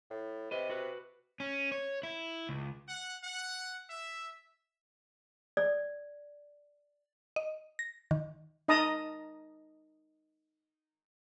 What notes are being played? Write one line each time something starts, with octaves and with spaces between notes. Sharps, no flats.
A2
C3 B4 D#5
F#4 B4
C#4
C#5
E4
C#2
F#5
F#5
E5
D5
D#5
A#6
D#3
D#4 D#5 A5 A#5 D#6